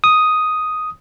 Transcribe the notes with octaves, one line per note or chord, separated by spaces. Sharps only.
D#6